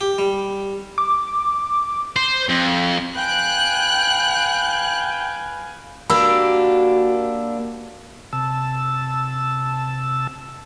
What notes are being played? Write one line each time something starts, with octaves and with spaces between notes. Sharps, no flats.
G4
G3
D6
C5
F2
B4 F5 G5 G#5 F#6
A#3 D4 F#4 G4 B5 E6
C3 A5 E6